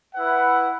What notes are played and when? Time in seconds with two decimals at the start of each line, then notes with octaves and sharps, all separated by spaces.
0.14 E4 B4 F#5